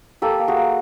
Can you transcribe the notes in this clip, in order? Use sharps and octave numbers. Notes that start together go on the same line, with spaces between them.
A#3 G4 A4
A#3
F#4 G#4
A#3